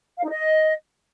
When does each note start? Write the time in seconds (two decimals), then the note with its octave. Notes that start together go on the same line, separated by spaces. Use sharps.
0.18 F5
0.24 D#4
0.30 D#5